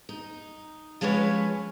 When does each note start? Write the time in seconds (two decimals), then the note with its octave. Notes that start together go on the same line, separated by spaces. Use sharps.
0.09 D#4
1.01 F3 G#3 C#4 B4 C#5